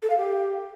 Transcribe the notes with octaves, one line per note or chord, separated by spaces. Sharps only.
A4
F5
G4